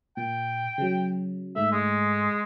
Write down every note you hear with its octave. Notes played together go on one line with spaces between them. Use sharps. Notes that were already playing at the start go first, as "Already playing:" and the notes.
A#2 G5
C#3 F#3
G#2 A3 E5
G#3